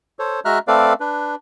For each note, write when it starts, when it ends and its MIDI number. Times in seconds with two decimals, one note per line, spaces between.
0.19 0.40 69
0.19 0.40 72
0.19 0.40 73
0.45 0.59 56
0.45 0.59 66
0.45 0.59 76
0.45 0.59 82
0.45 0.59 89
0.45 0.59 90
0.68 0.93 57
0.68 0.93 60
0.68 0.93 69
0.68 0.93 71
0.68 0.93 74
0.68 0.93 77
1.00 1.35 62
1.00 1.35 71